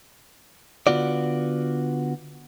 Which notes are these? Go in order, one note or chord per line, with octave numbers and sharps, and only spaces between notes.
D3 B3 F4 F#4 D5